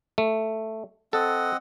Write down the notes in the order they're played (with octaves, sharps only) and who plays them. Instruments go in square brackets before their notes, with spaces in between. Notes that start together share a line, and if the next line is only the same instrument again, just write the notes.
[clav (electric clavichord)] A3
[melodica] C4 D#5 F#5 [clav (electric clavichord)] A4